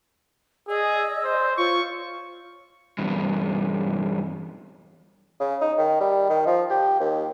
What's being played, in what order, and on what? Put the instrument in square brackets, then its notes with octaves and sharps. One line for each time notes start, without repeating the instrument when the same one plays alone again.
[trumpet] G#4 [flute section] D5 D#5 E6
[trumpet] C5
[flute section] F4 C5 C#5 [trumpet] C#6
[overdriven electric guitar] E2 G2
[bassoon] C#3
D#4
D#3
G3
D#3
F3
G4
D#2